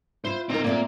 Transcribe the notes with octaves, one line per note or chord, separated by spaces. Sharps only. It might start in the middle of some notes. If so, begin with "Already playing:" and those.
E4 F4 C5
C4 D#4 F4 A#4 A#5
A#2 A3 A#3 C4